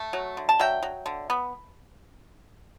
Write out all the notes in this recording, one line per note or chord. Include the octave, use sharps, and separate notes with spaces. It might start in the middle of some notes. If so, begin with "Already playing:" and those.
Already playing: A3
F#3
D3
A5
F#3 E5 G5
F#3
D3
B3